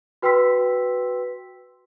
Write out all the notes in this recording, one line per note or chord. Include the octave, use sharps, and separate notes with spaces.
F#4 B4 G5 C6 E6 B6